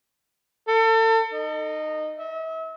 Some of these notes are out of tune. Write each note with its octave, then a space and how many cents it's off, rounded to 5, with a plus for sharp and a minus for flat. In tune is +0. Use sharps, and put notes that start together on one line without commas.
A4 +35
D#4 -15
E5 -40